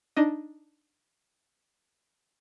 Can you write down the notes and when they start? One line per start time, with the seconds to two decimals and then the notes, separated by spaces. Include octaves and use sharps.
0.17 D4 D#4 D#5